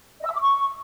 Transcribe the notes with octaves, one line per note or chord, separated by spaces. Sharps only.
D#5
E6
E5
D6
C#6